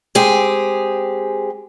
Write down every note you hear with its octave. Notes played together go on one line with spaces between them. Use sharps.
G#3 C4 G4 G#4